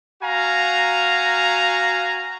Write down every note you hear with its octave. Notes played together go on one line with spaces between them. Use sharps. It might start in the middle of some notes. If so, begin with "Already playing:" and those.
F#4 F5 G#5 A#5